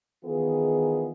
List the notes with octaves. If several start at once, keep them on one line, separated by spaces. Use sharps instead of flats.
D#3 E3 B3 F4 G#4